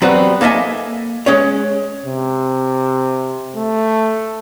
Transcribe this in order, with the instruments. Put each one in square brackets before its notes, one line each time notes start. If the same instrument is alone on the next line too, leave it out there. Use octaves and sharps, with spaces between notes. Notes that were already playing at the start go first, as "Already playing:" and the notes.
[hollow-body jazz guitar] F#3 G3 B3 C4 F#4
A#3 A4 D#5 E5 G#5
G#3 C#4 C#5
[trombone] C3
A3